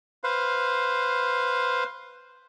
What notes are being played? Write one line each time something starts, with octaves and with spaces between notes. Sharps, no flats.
B4 C5 F5